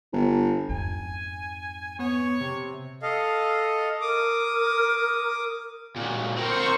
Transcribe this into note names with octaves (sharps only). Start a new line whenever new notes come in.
G1
F2 G#2 G#5
B3 C#5
C3
A4 D#5 F5
A#4 D6 D#6
A#2 F#3
C4 A#4 C5 C#6